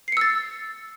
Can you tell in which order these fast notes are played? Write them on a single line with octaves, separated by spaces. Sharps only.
C7 C#7 E6 A6